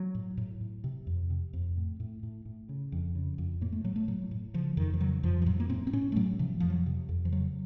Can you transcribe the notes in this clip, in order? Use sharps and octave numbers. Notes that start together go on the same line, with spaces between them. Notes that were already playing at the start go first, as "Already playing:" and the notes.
Already playing: F#3
A2
A2
A2
C3
F2
C3
F2
A2
A2
A2
A2
C#3
F2
C#3
F2
A2 A#3
A3
A2 F#3
A3
A2 F#3
A2
C#3 F3
F2 D#3
F3
C#3 F#3
F2 F3
F3
A2 F#3
A#3
A2 C4
C4
A2 C#4
A3
A2 F#3
C3 F3
F2 F3
F#3
C3
F2
F3
C#3 F#3